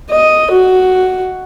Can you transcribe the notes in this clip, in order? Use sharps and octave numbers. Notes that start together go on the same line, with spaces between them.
D#5
F#4